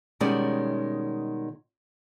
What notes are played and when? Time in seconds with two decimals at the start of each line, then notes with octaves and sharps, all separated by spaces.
0.20 B2 D#3 G3 G#3 C#4 D5